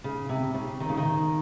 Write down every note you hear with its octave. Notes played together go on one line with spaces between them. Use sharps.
C#3
C3
C#3
D#3
C#3
D#3